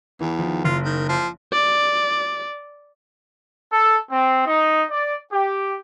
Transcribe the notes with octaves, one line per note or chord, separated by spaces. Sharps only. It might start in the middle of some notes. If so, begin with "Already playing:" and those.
E2 E3
D#3 F3
F#1 F4
D#3
F3
D5
A4
C4
D#4
D5
G4